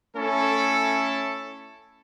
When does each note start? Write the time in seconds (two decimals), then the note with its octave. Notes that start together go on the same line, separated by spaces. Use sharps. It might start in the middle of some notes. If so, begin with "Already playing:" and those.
0.15 A3 C#4 E4 A4